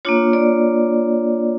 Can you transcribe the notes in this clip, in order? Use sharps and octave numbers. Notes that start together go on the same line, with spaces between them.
A#3 D4 F4 C#5
D5